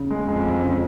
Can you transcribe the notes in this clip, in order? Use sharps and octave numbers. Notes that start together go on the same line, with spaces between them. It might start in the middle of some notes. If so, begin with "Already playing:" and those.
Already playing: C#3
G#3
F2 G#3
G#3
C#3